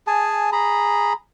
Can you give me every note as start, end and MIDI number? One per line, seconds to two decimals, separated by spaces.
0.07 0.50 68
0.07 0.50 80
0.07 0.50 81
0.52 1.13 68
0.52 1.13 82
0.52 1.13 83